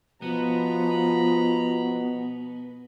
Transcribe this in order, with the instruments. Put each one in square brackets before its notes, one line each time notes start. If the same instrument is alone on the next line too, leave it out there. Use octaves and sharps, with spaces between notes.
[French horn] B2 [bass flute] F3 [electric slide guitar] B3 [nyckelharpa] A#5 B5